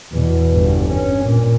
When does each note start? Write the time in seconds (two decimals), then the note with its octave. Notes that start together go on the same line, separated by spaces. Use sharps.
0.12 E2 B2
0.54 G1 E2
0.89 C#4
1.25 A#2